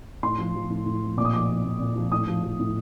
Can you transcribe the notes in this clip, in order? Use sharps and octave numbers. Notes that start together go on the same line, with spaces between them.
A2 C6
F3
F3
A2
A2
F3
A#2 D6
D#6
F3 D6
F3
A#2
A#2
F3
A2 D#6
F3
F3
A2